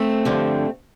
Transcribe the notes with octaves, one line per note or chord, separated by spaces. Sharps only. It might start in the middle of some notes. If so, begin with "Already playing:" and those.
Already playing: A3 C4
G2 D3 F3